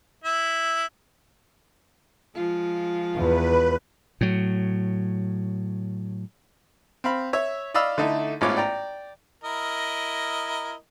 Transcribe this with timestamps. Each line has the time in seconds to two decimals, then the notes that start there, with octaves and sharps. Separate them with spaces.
0.24 E4
2.35 F3 G#3 F4
3.16 E2 B4
4.21 A2 F#3
7.04 C4 F5 B5
7.33 C#5 E5
7.74 D5 D#5 F5 B5 E6
7.98 D3 A3 D#4 E4
8.41 A1 G#2 B3 F4 C#5 D6
8.57 D5 G5 A#5
9.44 E4 A#4 D#5